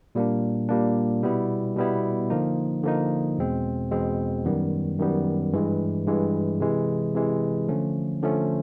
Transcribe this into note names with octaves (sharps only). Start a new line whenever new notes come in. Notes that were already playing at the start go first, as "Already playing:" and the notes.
A#2 G3 A#3 D4
A#2 G3 A#3 D4
B2 G3 B3 E4
B2 G3 B3 E4
D3 F3 A#3 D#4
D3 F3 A#3 D#4
E2 B2 G#3 C4
E2 B2 G#3 C4
F#2 D#3 G3 B3
F#2 D#3 G3 B3
G2 E3 G#3
G2 E3 G#3
C3 E3 G#3
C3 E3 G#3
D3 F3 A3 C#4
D3 F3 A3 C#4